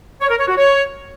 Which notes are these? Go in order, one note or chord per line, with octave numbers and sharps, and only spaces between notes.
C#5
A#4
C#5
F#4
C#5